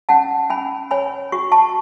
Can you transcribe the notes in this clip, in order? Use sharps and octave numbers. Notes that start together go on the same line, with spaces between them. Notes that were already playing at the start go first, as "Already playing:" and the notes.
C#4 F#5 A5
C#4 G#5 B5
C#5 G#5 B5
F#4 C#6
A5 C#6